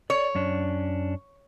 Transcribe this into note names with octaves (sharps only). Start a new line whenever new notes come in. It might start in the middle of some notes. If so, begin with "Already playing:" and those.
C#5 D5
F#2 C#4 D4